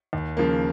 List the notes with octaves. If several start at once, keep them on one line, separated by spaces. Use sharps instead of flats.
D#2
C#3 F3 A#3